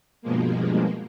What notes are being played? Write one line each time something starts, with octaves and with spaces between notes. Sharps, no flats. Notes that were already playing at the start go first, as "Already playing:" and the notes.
G2 B2 F3 G#3 A#3